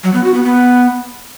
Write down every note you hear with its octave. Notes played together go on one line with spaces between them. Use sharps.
F#3
B3
F#4
B3
B3